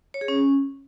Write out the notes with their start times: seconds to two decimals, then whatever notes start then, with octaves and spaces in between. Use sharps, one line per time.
0.14 C#5
0.21 G#4
0.28 C#4